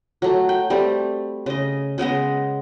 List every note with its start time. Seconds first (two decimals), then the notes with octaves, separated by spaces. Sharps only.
0.22 F#3 A3
0.49 G5
0.70 G3 A3 C4
1.46 C#3 D#5
1.98 C#3 G#3 B3 D#5